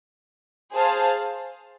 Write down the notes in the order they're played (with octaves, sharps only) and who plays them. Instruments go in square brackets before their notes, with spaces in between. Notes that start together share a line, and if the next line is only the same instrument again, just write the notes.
[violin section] G#4 C5 F5 A5